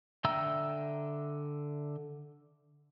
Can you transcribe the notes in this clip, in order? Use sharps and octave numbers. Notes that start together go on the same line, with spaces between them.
D3 E5 G5 A#5 E6